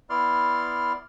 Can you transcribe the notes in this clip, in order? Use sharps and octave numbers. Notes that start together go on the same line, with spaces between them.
B3 E4 D5 C6 F6